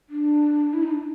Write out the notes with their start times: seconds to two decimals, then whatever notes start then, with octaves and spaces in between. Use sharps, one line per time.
0.09 D4
0.74 E4
0.83 D#4
0.91 D4